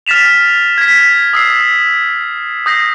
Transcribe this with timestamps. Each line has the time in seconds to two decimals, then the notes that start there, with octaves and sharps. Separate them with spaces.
0.07 F6 A6 B6 E7 F7
0.78 G#6 B6
1.33 D#6 E6 C7
2.66 D#6 G6 A#6 C7